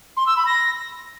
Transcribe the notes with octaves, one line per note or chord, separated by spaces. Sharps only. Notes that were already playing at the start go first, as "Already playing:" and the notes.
C6
E6
B5
A#6